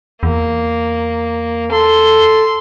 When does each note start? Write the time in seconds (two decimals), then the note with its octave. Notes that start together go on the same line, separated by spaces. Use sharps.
0.23 E2 A#3
1.72 A4 C6